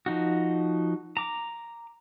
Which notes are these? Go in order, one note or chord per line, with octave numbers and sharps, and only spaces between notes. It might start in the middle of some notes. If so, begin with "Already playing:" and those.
F3 D#4 F#4
A#5 D6